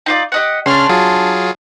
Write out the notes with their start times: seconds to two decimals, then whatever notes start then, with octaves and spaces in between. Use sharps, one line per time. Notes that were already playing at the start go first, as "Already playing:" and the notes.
0.06 D#4 F4 D5
0.32 G4 D#5 F#5
0.66 C#3 C#4 D4 C6 F6
0.89 F#3 F4 G#4